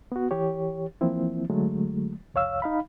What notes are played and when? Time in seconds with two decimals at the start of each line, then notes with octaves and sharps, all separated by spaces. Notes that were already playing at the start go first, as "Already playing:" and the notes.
0.12 B3 F#4
0.31 E3 G4 C#5
1.01 E3 F3 A#3 C4 E4
1.50 D3 F#3 G#3 A3
2.34 C2 F2 C#5 F5 E6
2.62 D#4 F5 B5